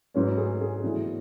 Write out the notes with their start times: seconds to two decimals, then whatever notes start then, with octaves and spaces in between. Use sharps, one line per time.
0.14 G#2 F#3 C#4 B4
0.37 G#4
0.61 G#4
0.83 A2 E3 B3 D4 F#4